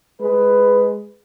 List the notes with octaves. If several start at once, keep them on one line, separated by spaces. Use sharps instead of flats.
G#3 B4